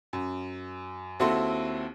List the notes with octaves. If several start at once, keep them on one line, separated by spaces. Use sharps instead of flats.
F#2
D#2 C4 E4 F#4 A4 C6